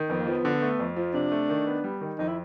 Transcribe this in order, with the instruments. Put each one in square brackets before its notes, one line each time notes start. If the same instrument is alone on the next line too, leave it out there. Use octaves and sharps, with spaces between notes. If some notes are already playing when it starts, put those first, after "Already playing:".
Already playing: [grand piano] D#3
[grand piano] F2 [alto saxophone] B3
[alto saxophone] A#3
[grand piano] F3 [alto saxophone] B3
[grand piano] D3
A3
F2
F3
[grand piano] C3 [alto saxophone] D4
[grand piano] A3
D#3
B3
G3
D#3
[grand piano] F2 [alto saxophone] D#4
[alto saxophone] E4